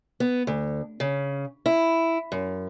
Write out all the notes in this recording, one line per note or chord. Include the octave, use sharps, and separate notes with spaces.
B3
D2
C#3
E4
F#2